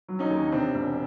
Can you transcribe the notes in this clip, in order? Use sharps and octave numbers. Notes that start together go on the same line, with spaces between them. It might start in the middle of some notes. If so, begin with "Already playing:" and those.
F#3
C#4 D#4
D#2
D#4
C3 C4 D4
E1